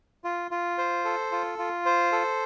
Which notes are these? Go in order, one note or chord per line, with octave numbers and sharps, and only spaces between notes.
F4
F4
C5
A4
F4
F4
C5
A4